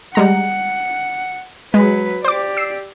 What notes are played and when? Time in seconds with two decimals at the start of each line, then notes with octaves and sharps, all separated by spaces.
0.15 G3 G#3 F#5 A#5
1.74 F#3 G#3 B4
2.24 G4 C5 D5 D6
2.57 E6 C7